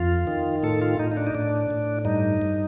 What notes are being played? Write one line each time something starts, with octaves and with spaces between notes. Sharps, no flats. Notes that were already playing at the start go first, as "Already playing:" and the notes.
Already playing: F2 F4
D#3
A2 A4
F4
A2 D#4
D#4
D4
D#4
A2 D4
A2
G2 D#4
G2